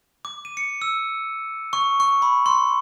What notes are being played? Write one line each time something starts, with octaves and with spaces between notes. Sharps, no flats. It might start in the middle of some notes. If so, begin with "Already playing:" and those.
D6
D#7
C#7
E6
C#6
C#6
B5
C6